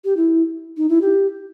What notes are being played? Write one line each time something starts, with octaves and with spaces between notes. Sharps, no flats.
G4
E4
D#4
E4
G4